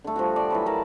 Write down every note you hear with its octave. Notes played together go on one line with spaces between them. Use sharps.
D3 A3
F3 G3 F#4
D5
E3 F#3 B5
A#4 A5 B5